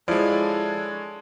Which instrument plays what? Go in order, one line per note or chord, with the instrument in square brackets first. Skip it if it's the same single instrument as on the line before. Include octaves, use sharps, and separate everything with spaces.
[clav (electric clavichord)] F3 [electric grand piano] G#3 D5 [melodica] D4 A4 C#5 [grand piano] E4